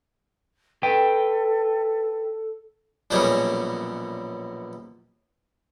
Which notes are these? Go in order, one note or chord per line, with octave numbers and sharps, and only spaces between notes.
A4 B4 G5
A#1 F#2 B2 G3 C#4 G#4